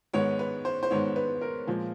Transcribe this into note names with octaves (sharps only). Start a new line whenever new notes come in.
G#2 D#3 G#3 B3 C#5
B4
C5
C5
G#2 D#3 G#3 B3 C#5
B4
A#4
A#2 F3 G#3